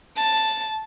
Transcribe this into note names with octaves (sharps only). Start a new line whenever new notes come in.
A5